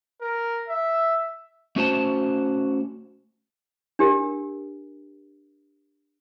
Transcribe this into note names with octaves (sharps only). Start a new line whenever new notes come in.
A#4
E5
A3 C#4 F#4 C5 A5
D4 G4 A#4